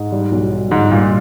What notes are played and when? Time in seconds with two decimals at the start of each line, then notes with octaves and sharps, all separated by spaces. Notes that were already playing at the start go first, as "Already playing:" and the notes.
Already playing: G#2
0.12 G3
0.31 B1
0.52 G3
0.71 G1 G#2
0.91 G2 A#2